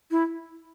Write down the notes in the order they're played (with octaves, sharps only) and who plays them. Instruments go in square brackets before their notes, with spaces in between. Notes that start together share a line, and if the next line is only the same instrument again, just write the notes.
[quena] E4